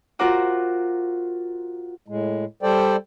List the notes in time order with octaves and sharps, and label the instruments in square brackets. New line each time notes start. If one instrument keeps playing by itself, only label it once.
[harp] F4 F#4 A#4 C5 F#5 D6
[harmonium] A2 G#3
G3 A4 C5 D5 G5